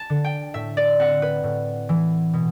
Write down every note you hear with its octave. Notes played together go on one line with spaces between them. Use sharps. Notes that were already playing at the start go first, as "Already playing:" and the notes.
Already playing: A5
D3
G5
A2 E5
D5
C4 F#5
B4
A2
E3
B2